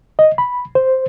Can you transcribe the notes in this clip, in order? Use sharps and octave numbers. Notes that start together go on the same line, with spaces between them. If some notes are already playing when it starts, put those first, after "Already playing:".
D#5
B5
C5